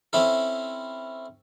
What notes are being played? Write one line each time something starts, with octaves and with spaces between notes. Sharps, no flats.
C4 C#4 E4 A4